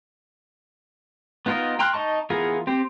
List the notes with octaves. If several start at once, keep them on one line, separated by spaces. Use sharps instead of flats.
B3 D#4 F4 A#4 D#5
G5 A#5 C6 F6 F#6
D#4 D#5 A5 C#6
E3 B3 F4 G#4 A#4
C4 G4 C5